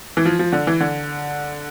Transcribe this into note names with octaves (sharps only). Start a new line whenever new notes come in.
E3
F3
F3
D3
E3
D3